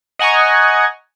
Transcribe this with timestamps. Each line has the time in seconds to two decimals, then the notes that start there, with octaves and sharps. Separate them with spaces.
0.19 D#5 F#5 G#5 A#5 C#6